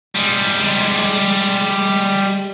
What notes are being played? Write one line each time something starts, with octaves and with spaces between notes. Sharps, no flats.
G3 G#3